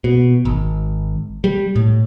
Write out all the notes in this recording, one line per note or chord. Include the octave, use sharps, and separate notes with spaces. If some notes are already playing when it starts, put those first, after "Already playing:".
B2
G#1
G3
A2